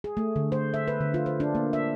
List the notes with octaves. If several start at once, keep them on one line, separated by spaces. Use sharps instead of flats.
G#4
A3
D3
C5
E5
B4
D3
F4
C5
D4
A#3
E5